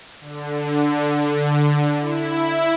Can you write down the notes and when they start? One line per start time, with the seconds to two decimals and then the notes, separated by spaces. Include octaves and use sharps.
0.20 D3
2.00 E4